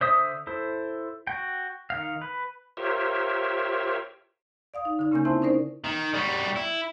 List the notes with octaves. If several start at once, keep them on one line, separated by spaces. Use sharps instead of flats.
D3 C5 E5 D#6
E4 A4 C5
F#4 G5
D#3 F5
B4
F4 G4 A#4 C5 C#5 E5
D5 F5 D#6
D#4
D3 D#4
C#3 A#3 C#4 A#4 G#5 G6
C4 E4 C5 E5 G#5 A5
C#4 D#4 A#4 C5 D5
D#3
G3 F#4
E4